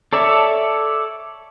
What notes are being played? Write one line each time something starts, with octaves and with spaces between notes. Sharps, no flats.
A4 C#5 D5 E5